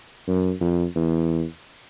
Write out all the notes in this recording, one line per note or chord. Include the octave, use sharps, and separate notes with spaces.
F#2
F2
E2